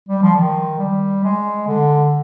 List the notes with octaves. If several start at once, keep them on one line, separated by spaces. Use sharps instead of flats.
G3
F3
D#3
G3
G#3
D3